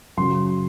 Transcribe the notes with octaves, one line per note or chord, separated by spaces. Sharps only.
F#2 C#3 F#3 C6